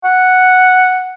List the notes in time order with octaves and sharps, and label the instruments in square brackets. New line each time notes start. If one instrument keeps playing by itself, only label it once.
[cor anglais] F#5